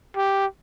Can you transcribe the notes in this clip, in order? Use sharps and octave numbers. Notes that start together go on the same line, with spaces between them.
G4